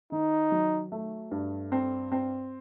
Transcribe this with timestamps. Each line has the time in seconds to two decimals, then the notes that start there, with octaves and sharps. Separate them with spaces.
0.12 D#3 D#4
0.52 F#3
0.92 A3
1.31 G2
1.72 C4
2.12 C4